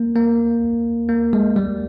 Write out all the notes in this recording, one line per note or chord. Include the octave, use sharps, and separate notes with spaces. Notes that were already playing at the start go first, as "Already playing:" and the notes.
Already playing: A#3
A#3
A#3
G#3
G3